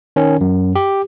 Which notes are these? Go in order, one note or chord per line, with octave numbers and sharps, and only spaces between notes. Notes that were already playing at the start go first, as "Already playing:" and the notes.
D#3 C#4
F#2
G4